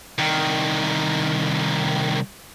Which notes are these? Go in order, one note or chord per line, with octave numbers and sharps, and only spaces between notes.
C2 D#3